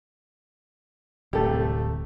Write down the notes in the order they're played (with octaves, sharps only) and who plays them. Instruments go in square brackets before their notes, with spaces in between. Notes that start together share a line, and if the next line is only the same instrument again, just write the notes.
[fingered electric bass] D1 [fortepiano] C2 A3 [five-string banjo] G4 A4